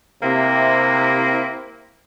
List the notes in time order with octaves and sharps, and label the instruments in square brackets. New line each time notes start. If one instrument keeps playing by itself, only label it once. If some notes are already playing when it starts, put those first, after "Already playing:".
[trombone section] C3 [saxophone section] A#3 C4 E4